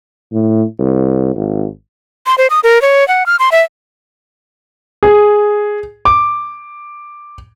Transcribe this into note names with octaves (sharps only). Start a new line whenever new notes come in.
A2
C2
G#1
C6
C5
D#6
A#4
C#5
F#5
F6
C6
E5
G#4
D6